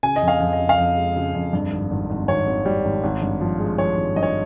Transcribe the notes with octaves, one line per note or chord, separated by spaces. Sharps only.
C#3 G#5
D#5
F2
F5
F2
D#5
C#3
F5
F2 D#5
G#3
C#3
F2
G2
G#1
G#1
G#1
G#1 C#5
G#1
G3
G#1
G#1
G2
F3
G#3
F3 C#5
G#1
G2 D#5
C#5